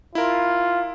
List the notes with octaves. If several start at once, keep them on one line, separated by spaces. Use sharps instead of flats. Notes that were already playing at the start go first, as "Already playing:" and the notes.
E4 F4 A#4